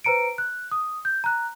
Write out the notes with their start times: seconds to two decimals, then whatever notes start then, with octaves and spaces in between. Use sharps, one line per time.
0.05 B4 C5 A#5 C#7 D7
0.38 F#6
0.71 D#6
1.05 G6
1.24 A#5 F#6